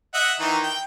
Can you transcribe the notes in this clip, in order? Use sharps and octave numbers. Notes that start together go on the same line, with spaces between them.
D#5 E5 F#5
D#3 E3 D#4
G5